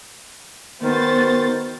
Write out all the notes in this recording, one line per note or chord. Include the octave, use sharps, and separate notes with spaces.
D#3 B3 F#4 C5 A6